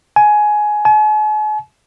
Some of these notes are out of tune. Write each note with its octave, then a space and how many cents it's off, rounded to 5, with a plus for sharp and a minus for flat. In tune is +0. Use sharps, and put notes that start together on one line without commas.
G#5 +15
G#5 +45